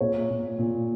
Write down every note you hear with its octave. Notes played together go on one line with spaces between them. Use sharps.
A#2 C#5
A#2
A#2